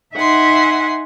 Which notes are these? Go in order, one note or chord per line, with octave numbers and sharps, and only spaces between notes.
D#4 E5 F#5 G#5 C6